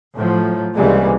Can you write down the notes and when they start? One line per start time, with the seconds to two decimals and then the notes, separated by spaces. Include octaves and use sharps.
0.15 A2 F3 F#3
0.75 C2 C#3 E3 G3 G#3 A#3